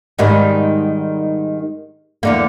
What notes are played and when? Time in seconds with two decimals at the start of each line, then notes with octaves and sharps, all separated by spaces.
0.19 G#2 D#3 G3
2.23 E2 D3 A#3